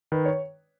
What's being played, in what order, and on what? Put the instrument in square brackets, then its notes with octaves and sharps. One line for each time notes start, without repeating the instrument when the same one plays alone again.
[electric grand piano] D#3 [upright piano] B4
[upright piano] C#5